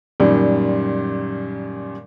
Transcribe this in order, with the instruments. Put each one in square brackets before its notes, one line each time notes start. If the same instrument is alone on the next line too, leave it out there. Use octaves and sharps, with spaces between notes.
[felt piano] F#2 A#2 D#3 G3